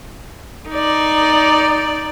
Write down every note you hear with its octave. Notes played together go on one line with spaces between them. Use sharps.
D#4 D5